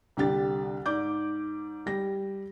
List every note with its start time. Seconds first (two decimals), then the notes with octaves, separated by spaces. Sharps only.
0.17 C2 D3 G4 A6
0.86 G#2 D5 D6 G6
1.86 G3 G4 A#6